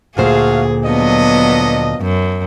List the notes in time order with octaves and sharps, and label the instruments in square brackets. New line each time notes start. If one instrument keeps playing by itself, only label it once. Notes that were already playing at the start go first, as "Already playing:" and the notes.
[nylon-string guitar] D2 A#2 C5 [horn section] A3 F#4 F5 [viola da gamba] G#4
[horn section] F3 D4 D#5 [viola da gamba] F#3 B3
[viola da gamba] F#2